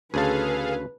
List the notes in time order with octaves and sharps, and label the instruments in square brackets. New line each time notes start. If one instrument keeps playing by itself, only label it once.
[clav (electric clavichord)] D2 C#3 A5 [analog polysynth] G#4 A4 F5 [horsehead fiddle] B4